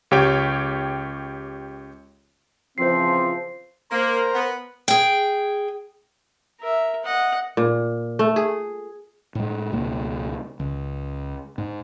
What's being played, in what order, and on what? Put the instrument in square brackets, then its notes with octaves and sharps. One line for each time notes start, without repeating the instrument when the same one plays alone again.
[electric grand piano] C#2 G4 C#5 G5
[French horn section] C#3 E3 F3 [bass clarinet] C4 [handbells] C5 C7
[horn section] A#3 [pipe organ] A#4 C5 A#5
[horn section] B3
[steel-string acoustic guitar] G#4 G5
[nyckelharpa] A#4 E5
D#5 F#5
[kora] A#2
A3
G#4
[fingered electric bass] A2 G#3
C#2 B2 A#3
C#2
G#2